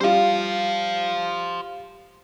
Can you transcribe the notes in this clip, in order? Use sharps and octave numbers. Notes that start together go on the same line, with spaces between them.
G3 F4 C5 F5